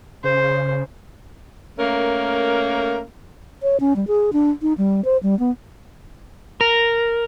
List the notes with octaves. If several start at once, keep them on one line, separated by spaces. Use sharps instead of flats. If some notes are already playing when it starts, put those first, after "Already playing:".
C#3 C5
A3 A#3 C#4 A#4
C#5
C#4
G3
G#4
D4
D#4
G3
C5
G3
B3
A#4